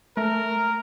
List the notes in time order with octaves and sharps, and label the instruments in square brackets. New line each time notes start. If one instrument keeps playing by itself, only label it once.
[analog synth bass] A3 [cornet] A#4